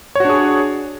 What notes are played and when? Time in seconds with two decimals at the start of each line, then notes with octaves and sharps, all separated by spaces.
0.15 C#5
0.20 F#4
0.25 D4
0.29 G#4